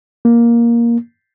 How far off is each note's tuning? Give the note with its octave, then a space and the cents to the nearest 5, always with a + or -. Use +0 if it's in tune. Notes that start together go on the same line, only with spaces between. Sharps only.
A#3 +10